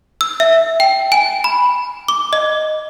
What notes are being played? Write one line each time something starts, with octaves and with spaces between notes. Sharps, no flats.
E6
E5
G5
G#5
B5
D6
D#5